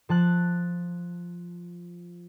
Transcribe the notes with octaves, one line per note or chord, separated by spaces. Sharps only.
F3 A5 F#6